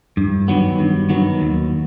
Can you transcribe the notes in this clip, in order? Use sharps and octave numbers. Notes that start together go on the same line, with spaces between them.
G2
D#3 F#3 B3
G2
D#3 F#3 B3
D#2